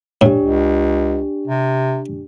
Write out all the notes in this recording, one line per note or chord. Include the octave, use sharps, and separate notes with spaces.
A2 D4 G4
C#2
C3